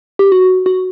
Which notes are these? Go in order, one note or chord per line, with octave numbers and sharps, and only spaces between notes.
G4
F#4
F#4